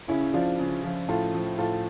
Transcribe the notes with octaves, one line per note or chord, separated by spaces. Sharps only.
C#3 C#4 E4
F3 D4 F4
C#3
F3
A2 F4 A4
F3
A2 F4 A4